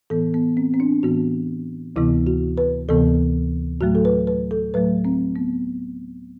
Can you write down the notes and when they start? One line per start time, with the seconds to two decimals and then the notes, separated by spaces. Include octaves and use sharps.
0.10 A2 E3 B3 A4
0.34 B3
0.57 C4
0.74 C4
0.80 D4
1.03 A2 E3 B3 F#4
1.96 D2 C3 E3 B3 E4
2.27 F#4
2.58 B4
2.89 D2 C3 E3 B3 A4
3.81 A2 F#3 A3 F#4
3.95 A4
4.05 B4
4.27 B4
4.51 A4
4.74 A2 F#3 A3 B4
5.05 C4
5.36 B3